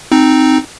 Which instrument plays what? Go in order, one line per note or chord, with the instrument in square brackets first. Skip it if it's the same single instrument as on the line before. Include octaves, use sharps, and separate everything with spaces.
[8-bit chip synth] C4 D#4